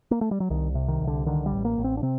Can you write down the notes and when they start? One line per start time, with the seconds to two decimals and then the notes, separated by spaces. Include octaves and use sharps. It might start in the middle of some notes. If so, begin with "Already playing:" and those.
0.11 A#3
0.21 A3
0.31 G3
0.40 F#3
0.50 C2 D#3
0.75 C3
0.88 D#3
1.02 C2
1.07 D3
1.26 D3 D#3
1.46 G3
1.52 A1
1.65 A#3
1.78 A1
1.84 C4
1.97 D4
2.03 C3 C4